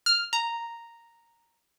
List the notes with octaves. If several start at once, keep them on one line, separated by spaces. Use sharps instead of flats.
F6
A#5